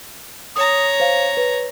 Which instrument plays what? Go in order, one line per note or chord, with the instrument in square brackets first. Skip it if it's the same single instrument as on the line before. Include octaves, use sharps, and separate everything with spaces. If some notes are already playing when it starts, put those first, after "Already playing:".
[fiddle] C#5 A#5 [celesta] D#6
[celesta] C5 F5
B4